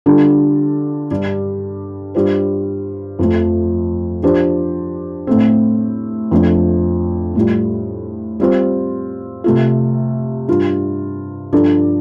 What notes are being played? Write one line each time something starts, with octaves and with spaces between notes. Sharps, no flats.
D3 G3 D4 F4 A4
G2 G3 D4 G4
G2 G3 F4 C5
F2 F3 A3
F3 D4 G4 C5
A2 A3 C4
F2 F3 A3 D4
A2 G3 F4
G3 C4 F4 C5
C3 A3 F4
G2 G3 F4
G2 F3 D4 A4 D5